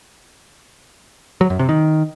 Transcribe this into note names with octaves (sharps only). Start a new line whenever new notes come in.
F#3
F#2
C3
D#3